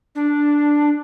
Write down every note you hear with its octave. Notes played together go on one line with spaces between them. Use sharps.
D4